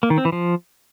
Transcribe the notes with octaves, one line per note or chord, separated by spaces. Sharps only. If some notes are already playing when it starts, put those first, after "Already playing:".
A#3
D#3
C4
E3
F3